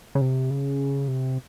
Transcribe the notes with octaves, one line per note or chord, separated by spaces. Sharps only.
C#3
C3
C#3
C3